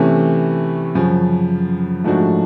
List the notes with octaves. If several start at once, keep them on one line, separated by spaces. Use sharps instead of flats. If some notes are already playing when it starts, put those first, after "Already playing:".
Already playing: C3 E3 A3 C#4
F#2 C#3 F3
G#2 F3 A3 D4 F#4